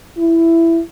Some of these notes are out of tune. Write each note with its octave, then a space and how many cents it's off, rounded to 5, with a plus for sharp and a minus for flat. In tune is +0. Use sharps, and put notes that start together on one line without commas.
E4 +10